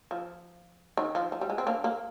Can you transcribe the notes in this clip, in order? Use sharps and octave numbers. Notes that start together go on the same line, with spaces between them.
F3
D#3
F3
F3
G3
G#3
C4
A#3 D4
A#3